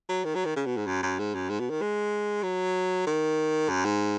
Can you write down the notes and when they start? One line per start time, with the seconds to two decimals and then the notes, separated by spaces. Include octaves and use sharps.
0.09 F#3
0.24 D#3
0.35 F#3
0.45 D#3
0.56 C#3
0.66 B2
0.77 G#2
0.87 F#2
1.03 F#2
1.19 G#2
1.35 F#2
1.50 G#2
1.60 B2
1.70 D#3
1.82 G#3
2.43 F#3
3.07 D#3
3.69 F#2
3.85 G#2